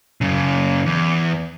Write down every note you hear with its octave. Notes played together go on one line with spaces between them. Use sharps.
F#2 C#3
E2